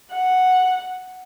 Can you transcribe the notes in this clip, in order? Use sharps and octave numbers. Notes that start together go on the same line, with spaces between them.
F#5